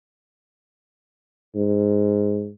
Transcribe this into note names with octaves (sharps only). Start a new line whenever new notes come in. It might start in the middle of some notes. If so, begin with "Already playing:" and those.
G#2